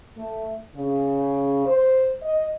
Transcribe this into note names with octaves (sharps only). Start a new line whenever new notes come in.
A3
C#3
C5
D#5